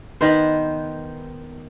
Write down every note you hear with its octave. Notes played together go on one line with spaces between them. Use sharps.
D#3 B3 B4 C5